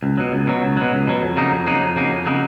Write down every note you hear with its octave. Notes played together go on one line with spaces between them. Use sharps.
C#2
B2 F#3
C#2
B2 F#3
C#2
B2 F#3
C#2
B2 F#3
F2
C#3 F#3 A#3 D#4
F2
C#3 F#3 A#3 D#4
F2
C#3 F#3 A#3 D#4
F2
C#3 F#3 A#3 D#4